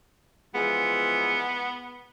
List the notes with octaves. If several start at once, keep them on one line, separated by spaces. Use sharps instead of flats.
E3 F3 G#3 B3